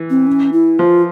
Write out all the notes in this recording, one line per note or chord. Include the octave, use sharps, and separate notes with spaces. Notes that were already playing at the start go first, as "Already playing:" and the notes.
Already playing: E3
C4
C#4
E4
F3 F4